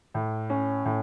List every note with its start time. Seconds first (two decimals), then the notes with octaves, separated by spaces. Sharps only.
0.14 A2
0.50 C#4
0.85 A2